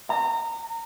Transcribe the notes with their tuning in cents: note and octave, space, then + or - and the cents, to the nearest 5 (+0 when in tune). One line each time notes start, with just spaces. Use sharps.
A#5 -25